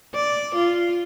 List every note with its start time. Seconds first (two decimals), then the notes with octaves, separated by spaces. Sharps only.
0.15 D5
0.55 F4